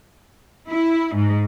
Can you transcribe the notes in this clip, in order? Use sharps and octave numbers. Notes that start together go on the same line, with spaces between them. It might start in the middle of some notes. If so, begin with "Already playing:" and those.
E4
G#2